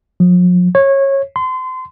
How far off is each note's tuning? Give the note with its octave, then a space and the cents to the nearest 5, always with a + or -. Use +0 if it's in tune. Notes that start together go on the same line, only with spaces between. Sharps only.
F3 +45
C#5 -20
C6 -30